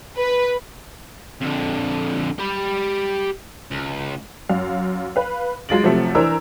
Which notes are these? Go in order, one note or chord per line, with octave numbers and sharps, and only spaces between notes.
B4
F2 D3
G4 B5
C#2
F#2 F5
B4 F5
F#3 G#3 F4 A6 D7 F#7
C3 F3 F#3 A3 C4
E3 D4 A#4 C5 A#5 E6